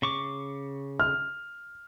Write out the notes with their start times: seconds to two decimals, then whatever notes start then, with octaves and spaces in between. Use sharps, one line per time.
0.02 C#3 C#6 D6
1.00 F6